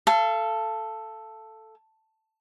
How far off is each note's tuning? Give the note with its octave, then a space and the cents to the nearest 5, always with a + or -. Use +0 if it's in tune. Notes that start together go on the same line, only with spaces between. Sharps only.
A4 +0 F5 -35